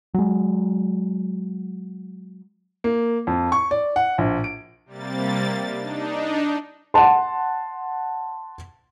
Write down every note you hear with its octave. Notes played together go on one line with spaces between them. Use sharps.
F#3 G#3
A#3
F2
C#6
D5
F#5
A#1
D7
C3 G3 A#3 A6
D4 D#4
F#5 A5 C6